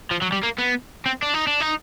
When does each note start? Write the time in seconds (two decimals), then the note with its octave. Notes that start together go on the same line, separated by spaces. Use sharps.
0.11 F3
0.22 F#3
0.32 G3
0.43 A#3
0.59 B3
1.06 C4
1.23 D4
1.34 D#4
1.48 D4
1.61 D#4